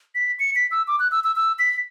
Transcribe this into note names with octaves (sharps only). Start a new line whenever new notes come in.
B6
C#7
B6
E6
D6
F#6
E6
E6
E6
B6